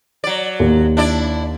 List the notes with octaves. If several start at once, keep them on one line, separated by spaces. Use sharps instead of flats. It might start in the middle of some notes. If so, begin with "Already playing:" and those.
F#3 D5
D#2
D4 E4 D5